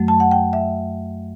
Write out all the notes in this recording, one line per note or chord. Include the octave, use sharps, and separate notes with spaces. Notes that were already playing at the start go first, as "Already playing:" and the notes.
Already playing: F#2 F#3 A3
A5
F#5
G5
E5